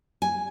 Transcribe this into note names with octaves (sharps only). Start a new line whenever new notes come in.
G#5